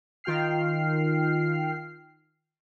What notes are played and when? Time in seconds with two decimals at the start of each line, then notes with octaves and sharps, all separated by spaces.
0.24 D#3 F4 G5 F6 C7